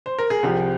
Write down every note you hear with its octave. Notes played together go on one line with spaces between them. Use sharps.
C5
A#4
G#4
C2 C3 F3 G4